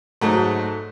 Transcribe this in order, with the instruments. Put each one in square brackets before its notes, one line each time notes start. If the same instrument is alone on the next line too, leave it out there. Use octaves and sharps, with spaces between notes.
[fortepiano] G#2 F#3 A3